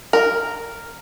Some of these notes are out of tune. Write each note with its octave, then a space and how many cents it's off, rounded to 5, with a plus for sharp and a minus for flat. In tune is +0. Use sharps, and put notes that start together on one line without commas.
A#4 -5